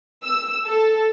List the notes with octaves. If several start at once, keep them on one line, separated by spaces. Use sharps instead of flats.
E6
A4